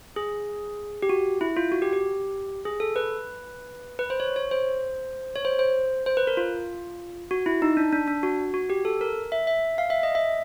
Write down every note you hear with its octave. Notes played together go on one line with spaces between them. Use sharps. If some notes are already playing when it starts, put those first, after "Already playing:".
G#4
G4
F#4
E4
F4
F#4
G4
G4
G#4
A4
B4
B4
C5
C#5
C#5
C5
C#5
C5
C5
C5
B4
A#4
F4
F#4
E4
D#4
D4
D4
D4
F#4
F#4
G4
A4
A#4
E5
E5
F5
E5
D#5
E5